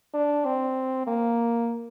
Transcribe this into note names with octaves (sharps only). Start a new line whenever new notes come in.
D4
C4
A#3